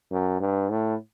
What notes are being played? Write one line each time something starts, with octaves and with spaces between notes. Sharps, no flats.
F#2
G2
A2